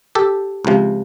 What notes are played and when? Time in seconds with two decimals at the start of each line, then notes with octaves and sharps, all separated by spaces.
0.15 G4 A4
0.65 C#2 C3 F3